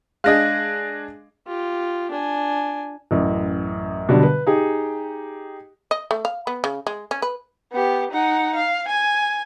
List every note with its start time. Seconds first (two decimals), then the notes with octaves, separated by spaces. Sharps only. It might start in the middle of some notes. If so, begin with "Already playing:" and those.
0.24 G#3 D4 G#4 D#5 F5 F#6 A#6
1.47 F4 G4
2.11 D4 G#5
3.11 A1 F#2
4.09 B2 D3 F#3 G3 D4
4.23 B4
4.47 D#4 G4 G#4
5.91 D#5
6.11 A3
6.25 F5
6.47 B3
6.64 C#3
6.87 G#3
7.11 C#4
7.22 B4
7.72 B3 G4
8.11 D#4 F#5
8.55 F5
8.88 G#5